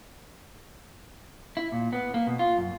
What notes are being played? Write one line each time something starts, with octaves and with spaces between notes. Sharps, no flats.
E4
A#2
B3
A#3
B2
F4
F#2